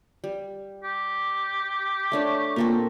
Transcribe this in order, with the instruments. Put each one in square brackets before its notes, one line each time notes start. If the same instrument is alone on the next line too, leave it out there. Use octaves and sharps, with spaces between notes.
[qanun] G3
[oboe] G4
[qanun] A3 D4 C#5
[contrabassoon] A#2 [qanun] C4 A4 A#4